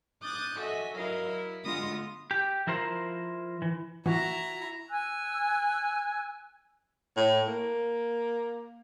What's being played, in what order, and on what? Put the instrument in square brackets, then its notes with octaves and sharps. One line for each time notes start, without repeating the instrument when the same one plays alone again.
[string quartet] D6 D#6 F#6 G6 A6
F#4 A4 D#5 E5 G#5
F#3 E4 A#4 D#5 F5
E4
D3 G#3 B3 F4 D#6 A#6
[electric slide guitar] G4
F3 E4 A#4 C5
E3
[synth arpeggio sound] E3 [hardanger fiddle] E4 A#5 [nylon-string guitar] F#4
[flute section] G#5 E6 F#6
[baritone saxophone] A2
A#3